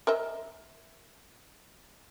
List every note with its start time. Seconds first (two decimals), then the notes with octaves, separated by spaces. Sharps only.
0.07 A#4 D#5 E5